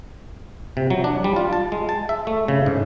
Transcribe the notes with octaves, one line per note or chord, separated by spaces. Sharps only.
C3
F#3
D4
G3
F4
A5
G#3
A5
E5
A3
C#3
G#2